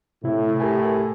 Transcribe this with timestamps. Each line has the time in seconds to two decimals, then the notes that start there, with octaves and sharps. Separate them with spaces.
0.24 A2 C3 E4
0.60 G4 A#4 G#5